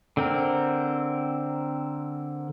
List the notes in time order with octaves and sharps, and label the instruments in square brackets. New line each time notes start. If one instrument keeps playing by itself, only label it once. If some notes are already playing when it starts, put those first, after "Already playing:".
[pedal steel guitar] D3 C4 A#4